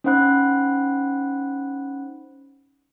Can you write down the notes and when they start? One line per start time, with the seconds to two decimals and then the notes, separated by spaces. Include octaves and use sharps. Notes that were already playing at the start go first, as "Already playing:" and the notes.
0.04 C#4 D#4 C5 F#5 B5 F#6